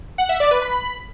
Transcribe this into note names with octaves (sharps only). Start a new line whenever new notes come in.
F#5
E5
D5
B4
B5